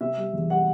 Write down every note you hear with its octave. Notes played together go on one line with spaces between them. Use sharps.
C3 E5
G3
E2
G3 F#5